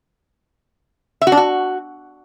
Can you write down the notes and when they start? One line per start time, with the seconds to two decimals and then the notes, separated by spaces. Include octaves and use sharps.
1.22 E5
1.27 F#4
1.32 D4
1.37 F#4